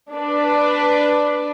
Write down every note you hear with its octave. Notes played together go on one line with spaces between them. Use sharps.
D4 B4 D5